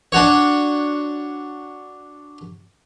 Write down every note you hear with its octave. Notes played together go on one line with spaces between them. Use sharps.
D4 F#4 C#5